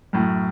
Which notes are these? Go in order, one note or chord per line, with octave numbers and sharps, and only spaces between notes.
F#2 A2